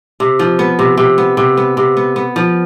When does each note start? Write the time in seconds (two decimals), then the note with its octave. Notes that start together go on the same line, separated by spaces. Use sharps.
0.20 C3
0.39 F3
0.59 B3
0.79 C3
0.97 C3
1.18 B3
1.37 C3
1.57 B3
1.77 C3
1.97 B3
2.16 B3
2.36 F3